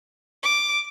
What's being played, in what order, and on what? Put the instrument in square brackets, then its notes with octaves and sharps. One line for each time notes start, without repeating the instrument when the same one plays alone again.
[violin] D6